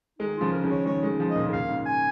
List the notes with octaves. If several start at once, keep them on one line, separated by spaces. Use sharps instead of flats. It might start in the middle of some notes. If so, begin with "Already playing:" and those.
D#3 G#3 D#4
F4
C#3 F3
D#3 A#4
C#3 F3
C#5
D#3 G#3 C#5
D#3 G#3
C#3 F3
D#5
A#2 D#3
C#3
A#2 F5
G#2 C#3
G#5